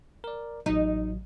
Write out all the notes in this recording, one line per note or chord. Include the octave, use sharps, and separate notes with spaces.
A#4 D5
A1 F#3 D#4